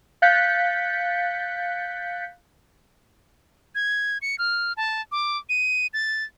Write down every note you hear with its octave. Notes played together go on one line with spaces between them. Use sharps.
F5 F#6 G6 A6 B6 C#7
G#6
C#7
F6
A5
D6
D#7
A6